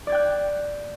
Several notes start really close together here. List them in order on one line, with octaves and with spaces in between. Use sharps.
D5 G#6 G5 F#6